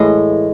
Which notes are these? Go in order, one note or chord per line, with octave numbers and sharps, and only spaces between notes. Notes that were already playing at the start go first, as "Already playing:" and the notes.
Already playing: A2 E3 G#3